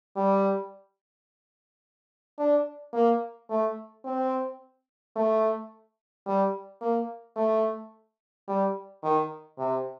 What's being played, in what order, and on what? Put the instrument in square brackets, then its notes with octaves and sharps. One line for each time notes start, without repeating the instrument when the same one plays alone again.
[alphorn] G3
D4
A#3
A3
C4
A3
G3
A#3
A3
G3
D#3
C3